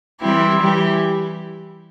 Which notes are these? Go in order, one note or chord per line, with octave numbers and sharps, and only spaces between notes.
E3 G3 C4 E4 G4
E3 G3 E4 G4